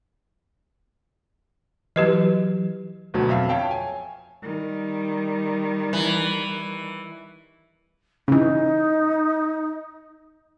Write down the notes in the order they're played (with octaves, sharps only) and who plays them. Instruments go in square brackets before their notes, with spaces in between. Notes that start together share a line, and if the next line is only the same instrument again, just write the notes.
[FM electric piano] E3 F#3 [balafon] G4 B4 D#5
[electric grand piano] D2 B2 F#3
F2 E5 F5
C#5 F5 G5 A5
G#5
[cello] D#3 G3
[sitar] E3
[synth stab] C#3 E3 [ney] D#4